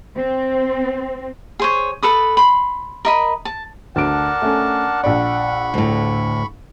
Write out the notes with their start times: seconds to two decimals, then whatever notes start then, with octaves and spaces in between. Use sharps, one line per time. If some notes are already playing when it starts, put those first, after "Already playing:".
0.17 C4
1.60 G#4 C5 C#5
2.03 A4 B4 D#6
2.37 B5 C6
3.05 A#4 D#5 B5
3.45 A5
3.96 D2 D4 A#4 F#5 A5 D7
4.42 A3 C#4
5.03 A#1 D5 B5 C#6
5.74 D2 A2